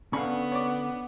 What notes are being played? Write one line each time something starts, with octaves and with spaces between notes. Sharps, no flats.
D3 B3 C#4 F5 B5 C#6
C#5 D5